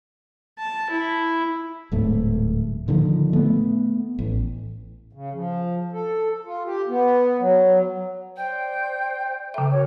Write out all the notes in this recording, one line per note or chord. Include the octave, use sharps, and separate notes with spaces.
A5
E4
D1 G#2 A3
A#2 D3 D#3 F3
A3 B3
A1
C#3
F3
A4
F4
G4
B3
F#3
C5 D5 G5 G6
C#3 A4 E5 G5 A#5
F#4 A#4 C#5